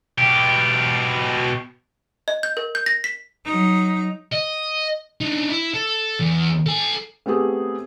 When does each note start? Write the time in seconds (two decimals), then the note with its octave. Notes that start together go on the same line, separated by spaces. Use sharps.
0.18 B2 G4
2.28 D#5
2.43 G6
2.57 A#4
2.75 G6
2.86 A#6
3.04 B6
3.45 F#3 D#4
4.33 D#5
5.21 D4 D#4
5.50 E4
5.74 A4
6.20 E2
6.66 A4 G#5
7.26 A3 B3 C4 G4 G#4